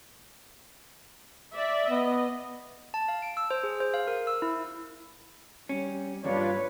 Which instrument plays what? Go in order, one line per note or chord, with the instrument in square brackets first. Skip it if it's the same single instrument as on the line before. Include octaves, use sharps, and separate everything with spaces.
[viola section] D5 E5
[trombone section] B3 [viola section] D#5
[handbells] A5
F5
D7
E6
C5
G#4
C5
F5
A#4
E6
E4
[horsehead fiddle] G3 [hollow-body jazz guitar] C#4
[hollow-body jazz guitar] E2 G2 [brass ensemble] D4 F4 [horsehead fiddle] B4 C#5